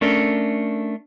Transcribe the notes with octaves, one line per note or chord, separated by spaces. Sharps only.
A3 C#4 D4 A4 A#4